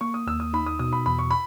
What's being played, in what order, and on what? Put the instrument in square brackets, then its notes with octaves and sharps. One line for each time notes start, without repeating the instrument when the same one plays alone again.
[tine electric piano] A#3 [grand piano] C#6
[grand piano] D#6
[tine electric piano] D#2 [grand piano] E6
[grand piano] D#6
[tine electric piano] D#4 [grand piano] B5
[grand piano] D#6
[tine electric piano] B2 [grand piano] D#6
[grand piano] B5
[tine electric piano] E2 [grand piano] B5
[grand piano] C#6
B5